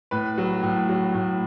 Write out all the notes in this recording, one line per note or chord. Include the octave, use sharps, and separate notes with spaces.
A2 B4
F#3
A2
F#3
A2